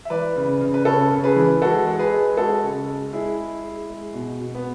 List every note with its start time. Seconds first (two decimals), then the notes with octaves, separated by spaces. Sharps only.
0.05 E5
0.10 E3 B4 D5
0.36 C#3
0.61 C#3
0.74 B4
0.85 C#3 A4 C#5
1.11 C#3
1.24 G#4 B4
1.36 E3
1.62 G#3 F#4 A4
1.87 G#3
1.99 G#4 B4
2.12 G#3
2.37 G#3 F#4 A4
2.62 C#3
2.88 G#3
3.13 G#3 E4 G#4
3.38 G#3
3.64 G#3
3.90 G#3
4.14 B2
4.40 B2
4.55 B3